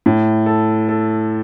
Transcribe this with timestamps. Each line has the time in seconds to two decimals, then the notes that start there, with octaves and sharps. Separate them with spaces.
0.06 A2
0.46 A4
0.88 A4